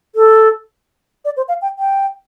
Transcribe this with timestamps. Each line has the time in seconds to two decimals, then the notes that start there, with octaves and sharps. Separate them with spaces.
0.15 A4
1.25 D5
1.37 C5
1.48 F5
1.62 G5
1.79 G5